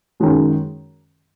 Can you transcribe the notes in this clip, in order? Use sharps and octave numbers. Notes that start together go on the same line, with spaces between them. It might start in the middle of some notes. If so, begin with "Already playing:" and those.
F#2 D#3 G#3 C#4